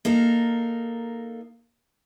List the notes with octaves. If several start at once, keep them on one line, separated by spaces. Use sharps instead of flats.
A#3 D#4 A4 A#4